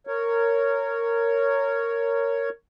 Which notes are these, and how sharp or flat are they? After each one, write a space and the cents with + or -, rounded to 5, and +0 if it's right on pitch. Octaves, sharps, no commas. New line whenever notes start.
A#4 -15 C#5 +0